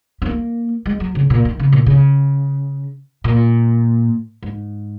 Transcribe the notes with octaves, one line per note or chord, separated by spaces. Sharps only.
C#4
A#3
G#3
F#3
C#3
A#2
D#3
C#3
A#2
C#3
A#2
G#2